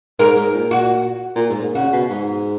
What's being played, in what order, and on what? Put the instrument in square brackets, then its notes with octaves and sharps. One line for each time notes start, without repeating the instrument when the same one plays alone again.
[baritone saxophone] G#2 [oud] A#4
[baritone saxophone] G#2
A#2
[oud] F#4
[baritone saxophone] A#2
G#2
A#2
[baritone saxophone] C#3 [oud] F#4
[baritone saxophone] B2
G#2